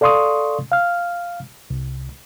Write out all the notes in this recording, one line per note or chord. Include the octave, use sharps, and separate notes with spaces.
A4 D5 F5 C6 C#6 D#6
F5 F6
C2